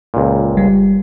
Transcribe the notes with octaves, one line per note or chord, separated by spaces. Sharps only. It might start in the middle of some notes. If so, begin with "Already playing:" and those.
C#2 A#2
G1 G3